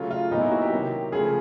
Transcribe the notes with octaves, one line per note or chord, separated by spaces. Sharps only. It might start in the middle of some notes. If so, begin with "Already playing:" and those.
Already playing: C#3 F#3 A3 F4
F4
A#2 F#3 B3 D#4
E4
F#4
G4
C3 D#3 F#3
C#3 F3 A3 G#4